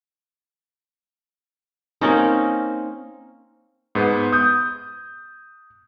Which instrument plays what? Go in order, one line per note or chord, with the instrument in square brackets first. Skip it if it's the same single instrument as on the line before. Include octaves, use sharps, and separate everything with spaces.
[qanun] A#3 C4 C#4 D#4
[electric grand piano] G#2 B3
D#6 G6